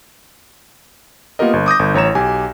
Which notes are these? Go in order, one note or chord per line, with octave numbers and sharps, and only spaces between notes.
A#3 B3 F4 G4 A#4 D#5
G1
D6 D#6 G6 A#6
G1
A1 C#5 A#5 E7
B1 G4 G#5